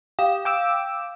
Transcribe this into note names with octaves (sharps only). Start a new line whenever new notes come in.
G4 F5
G5 D6 E6